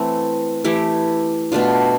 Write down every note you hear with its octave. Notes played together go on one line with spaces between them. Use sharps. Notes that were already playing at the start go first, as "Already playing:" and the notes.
Already playing: E3 A3 C4
E3 A3 E4 G4
B2 A3 D4 F4